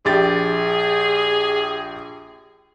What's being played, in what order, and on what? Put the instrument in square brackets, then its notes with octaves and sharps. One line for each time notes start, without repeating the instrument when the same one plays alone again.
[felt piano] A#1 G4 A6 [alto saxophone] G#4